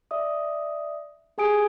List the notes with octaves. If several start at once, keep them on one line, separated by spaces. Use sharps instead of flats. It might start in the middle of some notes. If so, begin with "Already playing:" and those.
D5 E5 D#6
G4 G#4 G#5 D#6 D7